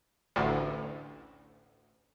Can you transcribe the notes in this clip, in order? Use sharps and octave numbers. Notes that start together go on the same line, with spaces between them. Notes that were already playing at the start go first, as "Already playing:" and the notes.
A1 D2 A2